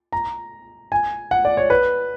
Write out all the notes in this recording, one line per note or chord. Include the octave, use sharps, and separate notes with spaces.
A#5
G#5
F#5
D5
C#5
B4